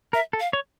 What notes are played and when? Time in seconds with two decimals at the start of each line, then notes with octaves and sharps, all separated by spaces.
0.13 A#4 E5
0.33 A4
0.40 F5
0.53 C#5